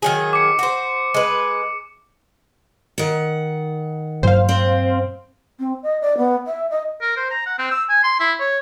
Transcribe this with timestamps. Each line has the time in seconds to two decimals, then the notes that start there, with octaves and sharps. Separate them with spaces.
0.02 D#3 F#3 G#4
0.33 D6 C#7
0.59 F#4 C5
1.14 G#3 B4
2.98 D#3 F#5
4.23 G2 A#2 F#3 C5 F5
4.49 C4
5.60 C4
5.83 D#5
6.01 D5
6.18 B3
6.46 E5
6.71 D#5
7.02 A#4
7.17 C5
7.31 A#5
7.47 F#5
7.59 C4
7.71 E6
7.89 G#5
8.04 C6
8.20 E4
8.40 C#5